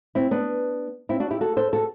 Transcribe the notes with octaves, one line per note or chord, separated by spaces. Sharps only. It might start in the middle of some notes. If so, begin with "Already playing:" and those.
C4 E4
B3 D4
C4 E4
D4 F#4
E4 G4
F#4 A4
A4 C5
F#4 A4